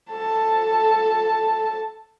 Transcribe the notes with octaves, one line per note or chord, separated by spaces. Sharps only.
A4 A5